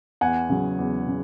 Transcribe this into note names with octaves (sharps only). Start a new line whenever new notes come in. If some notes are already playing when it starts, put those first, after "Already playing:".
E2 F#5 G#5
C#3 F#3
E2
C#3